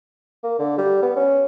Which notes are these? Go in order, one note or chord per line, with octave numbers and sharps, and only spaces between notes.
A#3
D3
G3
B3
C#4